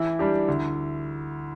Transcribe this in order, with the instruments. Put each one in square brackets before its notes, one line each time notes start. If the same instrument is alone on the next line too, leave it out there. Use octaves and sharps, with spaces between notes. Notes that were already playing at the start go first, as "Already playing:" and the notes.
Already playing: [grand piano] E3 [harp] E4
[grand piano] G3 D4 G4
D2